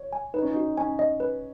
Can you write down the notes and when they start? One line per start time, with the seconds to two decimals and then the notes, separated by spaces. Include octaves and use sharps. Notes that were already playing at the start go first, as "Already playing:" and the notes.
Already playing: C#5
0.13 G#5
0.34 D#4 B4
0.42 C#4
0.50 D#4
0.56 F#4
0.77 C#4 G#5
0.99 D#5
1.20 B4